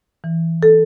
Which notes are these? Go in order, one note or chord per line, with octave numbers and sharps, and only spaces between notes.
E3
A4